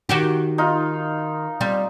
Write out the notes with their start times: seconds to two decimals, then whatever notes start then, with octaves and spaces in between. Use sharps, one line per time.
0.09 D#3 F#4 G4
0.58 D#4 F4
1.61 G3 C4